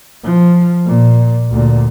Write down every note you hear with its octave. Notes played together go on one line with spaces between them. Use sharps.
F3
A#2
D2 A#2